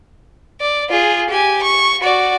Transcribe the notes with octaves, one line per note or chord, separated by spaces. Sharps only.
D5
F4 G#4
G4 G#5
C#6
F#4 D5